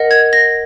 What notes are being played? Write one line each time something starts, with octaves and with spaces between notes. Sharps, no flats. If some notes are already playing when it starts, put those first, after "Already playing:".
Already playing: A#4 D#5 F#5
G#6
A#6